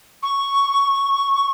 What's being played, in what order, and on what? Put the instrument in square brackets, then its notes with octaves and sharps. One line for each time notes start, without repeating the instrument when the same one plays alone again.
[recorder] C#6